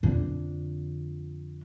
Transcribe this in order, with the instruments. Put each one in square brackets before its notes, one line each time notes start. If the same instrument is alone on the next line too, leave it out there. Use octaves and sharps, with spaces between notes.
[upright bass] F2 D3